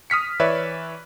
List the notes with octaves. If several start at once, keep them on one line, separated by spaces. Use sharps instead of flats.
D#6 F6 B6 C#7
E3 B4 C#5 D5 E5